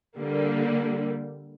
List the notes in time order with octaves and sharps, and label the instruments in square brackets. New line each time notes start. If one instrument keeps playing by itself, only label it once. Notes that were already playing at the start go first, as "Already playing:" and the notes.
[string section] D3 G3 A#3